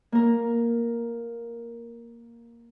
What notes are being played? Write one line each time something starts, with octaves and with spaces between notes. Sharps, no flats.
A#3 A#4